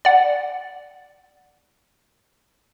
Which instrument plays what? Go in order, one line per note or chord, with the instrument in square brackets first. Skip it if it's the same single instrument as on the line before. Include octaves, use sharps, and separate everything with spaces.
[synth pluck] D5 F#5